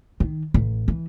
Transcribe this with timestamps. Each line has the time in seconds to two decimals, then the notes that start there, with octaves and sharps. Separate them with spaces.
0.20 D#3
0.54 A1
0.88 E3